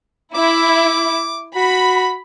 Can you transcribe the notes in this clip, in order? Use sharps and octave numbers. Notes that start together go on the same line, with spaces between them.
E4 D6
F#4 B5